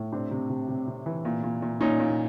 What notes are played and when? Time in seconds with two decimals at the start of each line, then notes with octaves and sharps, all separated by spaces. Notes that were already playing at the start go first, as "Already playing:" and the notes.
Already playing: A2
0.12 C3 C4 D4
0.31 C3
0.50 C3
0.69 C3
0.87 C3
1.06 E3
1.25 A#2
1.43 A#2
1.62 A#2
1.81 A#2 C#4 D#4
2.00 A#2